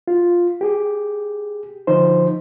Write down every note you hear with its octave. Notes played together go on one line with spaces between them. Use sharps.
F4
G4 G#4
D3 F3 D#4 C5